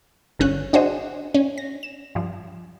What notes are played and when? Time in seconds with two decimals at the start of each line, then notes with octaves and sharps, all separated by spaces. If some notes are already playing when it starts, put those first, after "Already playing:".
0.39 G1 D3 C#4 F#6
0.73 D4 F#4 G#4 C5 D#5
1.35 C#4
1.58 A#6
1.83 E7
2.15 G2 F3